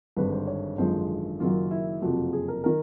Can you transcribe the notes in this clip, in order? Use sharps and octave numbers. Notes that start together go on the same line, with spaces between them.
G#1 G2 D3 B4
C5
C#5
G#1 F#2 D3 F3 G#3 C5
F#1 F#2 D#3 F#3 F4
E4
F#1 F2 C3 F3 F#4
G#4
A#4
D#3 A#4